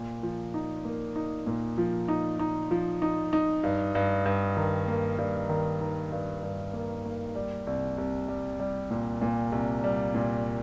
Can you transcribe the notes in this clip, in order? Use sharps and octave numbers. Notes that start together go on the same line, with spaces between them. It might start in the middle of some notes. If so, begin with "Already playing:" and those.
Already playing: A#2
F3
D#4
A#3
D#4
A#2
F3
D#4
D#4
F3
D#4
D#4
G2
G2
G2
D#3
A#3
G2
D#3
D#3
G2
G2
A#3
A#3
G3
C2
C2
G3
G3
A#2
A#2
C2
G3
A#2